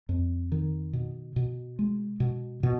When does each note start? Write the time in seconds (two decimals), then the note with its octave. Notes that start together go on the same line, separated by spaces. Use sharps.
0.09 F2
0.52 D#3
0.93 B2
1.36 B2
1.79 G#3
2.20 B2
2.63 B2